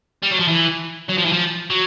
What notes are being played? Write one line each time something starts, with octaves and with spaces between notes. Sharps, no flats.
G3
F#3
F3
E3
F#3
F3
E3
F3
F#3